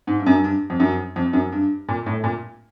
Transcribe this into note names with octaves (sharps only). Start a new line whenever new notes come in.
G#2
G2
F#2
G2
G2
F2
F#2
F2
F#2
G2
A#2
A2
A#2